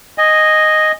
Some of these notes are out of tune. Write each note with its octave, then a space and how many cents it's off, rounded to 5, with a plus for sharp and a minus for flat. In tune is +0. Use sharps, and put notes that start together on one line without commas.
D#5 +0 G#5 -10